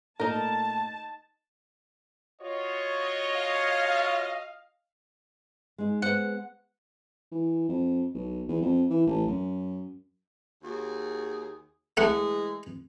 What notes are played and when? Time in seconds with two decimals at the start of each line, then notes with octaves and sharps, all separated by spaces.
0.20 A#2 A3 D#4 A#4 A5
2.41 F4 F#4 C#5 D#5
3.34 F5
5.78 G#3 D#4
6.02 G#3 B3 C5 F#5
7.32 E3
7.68 F2
8.14 B1
8.48 E2
8.62 F2
8.90 E3
9.07 A1
9.27 F#2
10.64 D#2 F#4 G#4
11.97 E3 G#3 A3 G#4 F#5